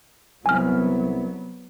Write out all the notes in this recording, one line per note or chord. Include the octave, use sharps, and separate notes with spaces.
C2 F#3 B3 G#5 F6